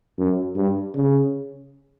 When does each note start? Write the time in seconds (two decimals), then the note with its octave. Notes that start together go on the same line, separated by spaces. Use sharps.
0.18 F#2
0.56 G2
0.95 C#3